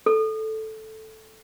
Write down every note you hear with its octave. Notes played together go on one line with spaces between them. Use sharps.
A4